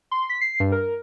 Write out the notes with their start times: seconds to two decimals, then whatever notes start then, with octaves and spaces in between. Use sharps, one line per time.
0.11 C6
0.29 B6
0.41 C7
0.60 G2
0.72 A#4